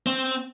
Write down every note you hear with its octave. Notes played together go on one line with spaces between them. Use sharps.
C4